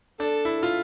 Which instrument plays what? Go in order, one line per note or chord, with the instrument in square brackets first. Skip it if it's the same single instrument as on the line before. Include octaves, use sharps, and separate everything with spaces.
[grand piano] D4 [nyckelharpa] A4
[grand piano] E4
F4